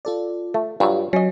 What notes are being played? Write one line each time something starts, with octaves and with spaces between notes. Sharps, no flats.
F4 A4 D5
A3
G2 F#3 F4 G4
F#3 C#4 D#5